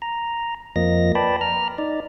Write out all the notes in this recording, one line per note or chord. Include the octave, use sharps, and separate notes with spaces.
A#5
F2 F3 A#3 D#5 A#6
B4 D5 G5 A5 B5
A#5 F6
D#4 D5